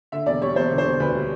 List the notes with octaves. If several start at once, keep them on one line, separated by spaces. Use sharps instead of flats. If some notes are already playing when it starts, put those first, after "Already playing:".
D3 E5
E1 D5
G3 C#5
E1 C5
D3
C5
E1
D2 B4
G3